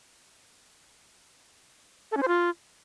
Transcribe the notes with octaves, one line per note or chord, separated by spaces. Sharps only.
A4
C#4
C5
F4